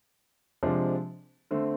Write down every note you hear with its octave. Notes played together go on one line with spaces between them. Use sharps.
C3 F3 G#3 D4
D3 A3 C4